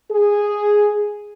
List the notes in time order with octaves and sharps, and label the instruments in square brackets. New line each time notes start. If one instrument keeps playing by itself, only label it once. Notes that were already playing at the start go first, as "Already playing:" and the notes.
[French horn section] G#4